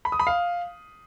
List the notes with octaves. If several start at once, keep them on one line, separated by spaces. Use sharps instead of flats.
B5
D#6
B5
F5